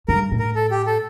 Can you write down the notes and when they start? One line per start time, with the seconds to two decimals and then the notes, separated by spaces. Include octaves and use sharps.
0.08 G2 A#4
0.31 A2
0.40 A#4
0.55 A4
0.71 G4
0.87 A4